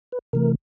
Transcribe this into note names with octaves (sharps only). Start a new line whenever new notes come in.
B4
C3 E3 A3 A#4